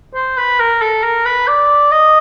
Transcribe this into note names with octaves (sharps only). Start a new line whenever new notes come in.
C5
B4
A#4
A4
A#4
B4
D5
D#5